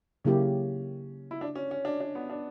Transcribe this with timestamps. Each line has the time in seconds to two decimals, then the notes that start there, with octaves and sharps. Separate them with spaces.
0.24 C#3 F#3 A#3 C#4 E4 G4
1.31 E4
1.41 D4
1.55 C#4
1.71 C#4
1.85 D4
2.01 D4
2.15 B3
2.30 D4